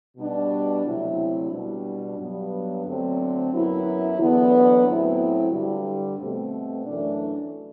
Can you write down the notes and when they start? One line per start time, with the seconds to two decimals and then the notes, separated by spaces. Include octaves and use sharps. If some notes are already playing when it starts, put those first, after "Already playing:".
0.17 B2 G3 D4
0.84 D2 C3 F#3 C4 E4
1.51 B2 G3 D4
2.18 G2 F#3 B3
2.85 D2 D3 F#3 C4
3.51 F#2 F#3 B3 E4
4.18 E2 D3 F#3 B3 D4
4.84 A2 F#3 C4 E4
5.51 G2 D3 G3
6.18 B2 A3 C4
6.85 F#2 E3 A3 D4